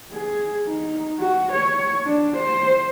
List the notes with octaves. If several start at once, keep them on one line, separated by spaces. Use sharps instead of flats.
G#4
D#4
F#4
C#5
D4
C5